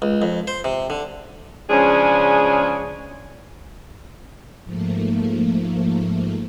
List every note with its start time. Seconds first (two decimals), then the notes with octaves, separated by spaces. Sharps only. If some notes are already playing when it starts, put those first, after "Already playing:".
0.02 C#2
0.22 F2
0.47 C5
0.64 C3
0.90 D3
1.70 C#3 F3 G#3 C#4 D4 G#4
4.64 G#2 F3 A3 A#3